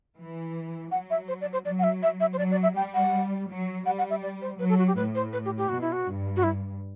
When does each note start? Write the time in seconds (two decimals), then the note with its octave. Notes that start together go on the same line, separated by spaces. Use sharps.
0.19 E3
0.91 F#3 F#5
1.10 E5
1.28 C5
1.41 D5
1.53 C5
1.65 F#3 D5
1.79 F#5
1.83 E5
2.03 E5
2.20 E5
2.33 C5
2.38 F#3 D5
2.51 D5
2.63 E5
2.76 G3 G5
2.94 F#5
3.49 F#3
3.86 G3 F#5
3.98 F#5
4.10 E5
4.23 D5
4.42 C5
4.59 F#3 B4
4.69 A4
4.78 F#4
4.87 G4
4.96 A2 B4
5.15 C5
5.33 B4
5.45 G4
5.57 G4
5.69 B2 F#4
5.81 E4
5.92 F#4
6.06 G2
6.36 F#4
6.43 E4